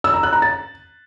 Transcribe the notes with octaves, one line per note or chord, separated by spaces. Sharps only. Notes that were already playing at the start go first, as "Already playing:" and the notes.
E6
A#5
F#6
A#5
A6